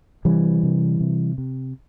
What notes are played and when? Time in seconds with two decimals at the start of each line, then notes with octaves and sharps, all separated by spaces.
0.25 C3 E3 G3
0.63 C3
1.01 C3
1.38 C3